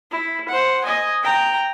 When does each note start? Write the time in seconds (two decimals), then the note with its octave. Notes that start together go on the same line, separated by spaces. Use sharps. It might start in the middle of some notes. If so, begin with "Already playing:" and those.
0.11 E4
0.49 C5 F#5
0.84 D#5 G#5
1.23 G5 A#5